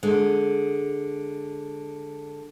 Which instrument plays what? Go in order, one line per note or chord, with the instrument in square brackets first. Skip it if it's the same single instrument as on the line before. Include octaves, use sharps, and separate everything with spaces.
[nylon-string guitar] D3 G#3